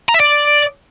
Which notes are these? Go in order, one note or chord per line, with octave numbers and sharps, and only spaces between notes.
A#5
E5
D5